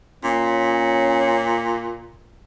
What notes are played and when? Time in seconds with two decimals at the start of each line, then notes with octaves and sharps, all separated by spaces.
0.24 A#2 C#4